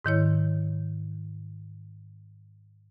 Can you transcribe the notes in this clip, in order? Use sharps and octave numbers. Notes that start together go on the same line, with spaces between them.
G#2 D#3 E4 C#5